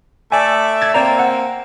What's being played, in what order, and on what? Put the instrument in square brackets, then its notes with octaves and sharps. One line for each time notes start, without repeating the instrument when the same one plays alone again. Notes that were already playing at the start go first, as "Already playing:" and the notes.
[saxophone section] A3 D5 E5 [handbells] G#5
[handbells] G#6 A6
[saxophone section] A#3 C4 [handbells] D5 A#5
[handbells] F#5